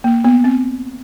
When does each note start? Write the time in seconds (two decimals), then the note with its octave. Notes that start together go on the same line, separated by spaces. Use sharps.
0.04 A#3
0.25 B3
0.44 C4